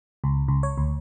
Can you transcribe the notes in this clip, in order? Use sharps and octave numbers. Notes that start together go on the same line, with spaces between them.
C#2
C#2
C#5
D2